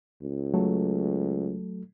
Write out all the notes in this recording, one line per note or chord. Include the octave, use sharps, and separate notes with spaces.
C#2
F#3 A3 A4